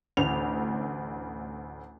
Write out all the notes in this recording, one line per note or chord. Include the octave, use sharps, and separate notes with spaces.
A1 D2 F7